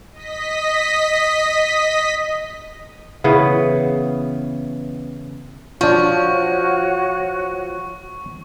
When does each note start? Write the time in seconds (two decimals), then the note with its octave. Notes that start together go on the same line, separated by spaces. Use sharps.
0.13 D#5 B6
3.24 C#3 E3 B3
5.81 F3 D4 F4 F#4 C#5 C#6